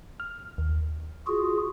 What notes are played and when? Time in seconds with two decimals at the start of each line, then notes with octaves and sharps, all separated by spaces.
0.20 F6
0.58 D#2
1.27 F4 F#4 G#4